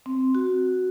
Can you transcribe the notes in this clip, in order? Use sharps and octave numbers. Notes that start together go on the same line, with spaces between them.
C4
F#4